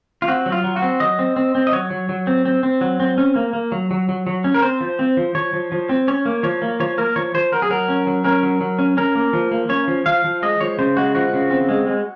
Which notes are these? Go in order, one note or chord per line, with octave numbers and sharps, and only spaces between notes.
F4
C4 F#4
F#3
F4
F#3
F#4
C4
F#3 D#5
C4
C4
C4
D#5
F#3 C#5
F#3
F#3
C4
C4
C4
F#3
C4
C#4
A#3
A#3
F#3
F#3
F#3
F#3
C#4
A#4
C4 C5
F3
C4
F3
F3 C#5
F3
F3
C4
C#4 C#5
A#3
F3 C#5
A#3
F3 C#5
A#3 A#4
F3 C#5
F3 C5
F#3 A#4
G#4
F#3 A#4
C#4
F#3
C#4 A#4
F#3
F#3
C#4
C#4 A#4
A#3
F3
A#3
C#4 C#5
F3
F3 F5
F3
G#3 D#5
F3 C#5
C#3 C5
G#3 F#4
F3 F#4
C#3
C4
G#3
G#3